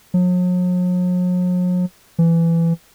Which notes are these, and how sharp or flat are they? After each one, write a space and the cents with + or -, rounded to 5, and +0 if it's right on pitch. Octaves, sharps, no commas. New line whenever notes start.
F#3 -45
E3 +20